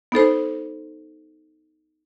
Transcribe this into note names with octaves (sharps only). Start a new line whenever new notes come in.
B3 D#4 A4 C5